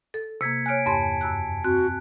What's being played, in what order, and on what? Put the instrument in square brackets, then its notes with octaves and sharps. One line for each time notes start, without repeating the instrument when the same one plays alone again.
[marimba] A4
[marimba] C3 A#3 [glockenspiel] G#6 B6 C#7
[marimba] C#5 F6 F#6 [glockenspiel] G#5 D7
[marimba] E2 G2 C6 [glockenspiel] A5
[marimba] F#2 E6 F#6
[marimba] C4 [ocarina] F#4 [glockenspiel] F#6